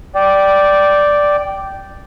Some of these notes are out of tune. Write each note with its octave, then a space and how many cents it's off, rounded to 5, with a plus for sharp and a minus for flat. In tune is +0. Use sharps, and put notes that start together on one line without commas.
D5 +0 G5 -10